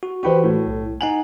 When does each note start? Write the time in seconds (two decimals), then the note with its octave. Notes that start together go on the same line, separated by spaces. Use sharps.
0.03 F#4
0.23 E3 E4 F#4 G4 B4 C5
0.44 A2
0.66 B1
1.01 D#4 F#5 G#5 F#7